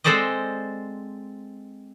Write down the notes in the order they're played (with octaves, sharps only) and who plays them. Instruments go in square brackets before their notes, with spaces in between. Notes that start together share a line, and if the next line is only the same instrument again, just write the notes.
[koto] G#3 C4 A4 C5 D5 D#5